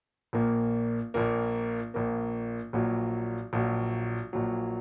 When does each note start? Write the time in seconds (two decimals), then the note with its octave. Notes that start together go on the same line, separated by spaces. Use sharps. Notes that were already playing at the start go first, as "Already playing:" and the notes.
0.33 A#1 A#2 A#3
1.14 A#1 A#2 A#3
1.94 A#1 A#2 A#3
2.73 A#1 A#2 F#3
3.53 A#1 A#2 F#3
4.33 A#1 A#2 F#3